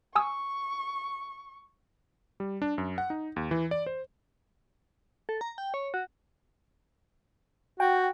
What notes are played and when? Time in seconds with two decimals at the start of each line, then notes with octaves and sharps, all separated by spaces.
0.15 G#5 C#6 D#6 E6
2.40 G3
2.62 D4
2.78 F#2
2.98 F#5
3.10 D#4
3.36 D#2
3.51 E3
3.71 D5
3.86 C5
5.29 A4
5.41 A#5
5.58 G5
5.74 C#5
5.94 F#4
7.80 F#4 G5